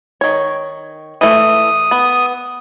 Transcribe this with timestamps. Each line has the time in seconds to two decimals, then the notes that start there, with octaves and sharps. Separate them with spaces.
0.21 D#3 C#5
1.21 E3 A3 D#6
1.91 B3